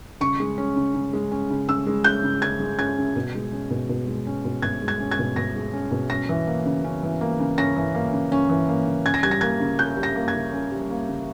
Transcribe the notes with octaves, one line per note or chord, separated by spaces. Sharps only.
C#3 C#6
G#3
C#4
C#3
C#3
G#3
C#4
C#3
C#3 E6
G#3
C#4 G6
C#3
C#3 G#6
G#3
C#4 G#6
C#3
B2
G#3
C#4
B2
B2
G#3
C#4
B2
B2 G#6
G#3
G#6
C#4
G#6
B2
B2 A#6
G#3
C#4
B2
C#4 A#6
E3
A#3
C#3
C#4
E3
A#3
C#3
C#4 A#6
E3
A#3
C#3
C#4
E3
A#3
C#3
C#4 G#6
A#6
G3 G#6
A#6
A#3 G#6
C#3
C#4 G6
G3
A#6
A#3
G#6
C#3
C#4
G3
A#3
C#3